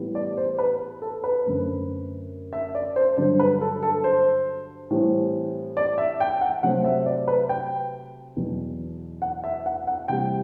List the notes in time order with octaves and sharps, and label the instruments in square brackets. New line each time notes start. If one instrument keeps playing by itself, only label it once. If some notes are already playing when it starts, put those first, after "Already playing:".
Already playing: [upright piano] A2 E3 G3 B3
D5
C5
B4
A4
B4
F#2 D3 A3 C4
E5
D5
C5
G2 D3 F#3 C5
B4
A4
A4
C5
A2 E3 G3 C4
D5
E5
G5
F#5
C3 F#3 A3 C4 F#5
E5
D5
B4
G5
E2 B2 F#3
F#5
E5
F#5
F#5
C3 E3 G3 G5